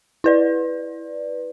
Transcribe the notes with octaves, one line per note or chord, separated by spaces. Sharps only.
E4 B4 D5